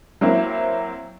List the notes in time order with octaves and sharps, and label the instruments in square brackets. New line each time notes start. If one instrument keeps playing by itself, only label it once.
[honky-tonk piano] F#3 A#3 C4 E4